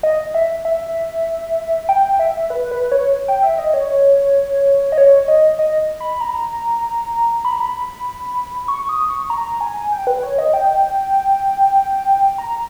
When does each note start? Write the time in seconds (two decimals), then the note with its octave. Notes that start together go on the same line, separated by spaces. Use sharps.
0.03 D#5
0.34 E5
0.65 E5
1.89 G5
2.19 E5
2.50 B4
2.71 B4
2.92 C#5
3.28 G5
3.43 E5
3.58 D#5
3.74 C#5
4.92 D#5
4.98 C#5
5.28 D#5
5.59 D#5
6.00 B5
6.21 A#5
7.45 B5
7.53 A#5
7.60 B5
8.68 C#6
8.89 D#6
9.10 C#6
9.30 A#5
9.61 G#5
9.92 G5
10.07 B4
10.23 C#5
10.38 D#5
10.53 G5
12.38 A#5